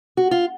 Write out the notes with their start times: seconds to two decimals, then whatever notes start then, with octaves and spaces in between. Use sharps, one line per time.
0.17 F#4
0.31 F4